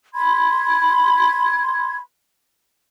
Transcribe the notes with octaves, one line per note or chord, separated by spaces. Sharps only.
B5 C6 G#6